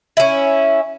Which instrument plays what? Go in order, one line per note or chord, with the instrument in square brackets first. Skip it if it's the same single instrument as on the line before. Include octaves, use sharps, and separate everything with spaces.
[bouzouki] C#4 E4